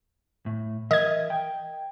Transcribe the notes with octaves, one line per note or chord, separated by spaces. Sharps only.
A2
E3 A#4 D#5 E5 G#6
G5